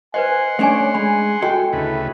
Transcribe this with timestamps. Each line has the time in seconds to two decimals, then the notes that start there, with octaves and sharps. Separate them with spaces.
0.14 B4 C5 D#5 F#5 G#5 C6
0.59 A3 C#4 D4 C#5 D#5 G#5
0.94 G#3 G#5 B5
1.42 F#4 A4 D#5 G5
1.73 D2 C#3 E4 B4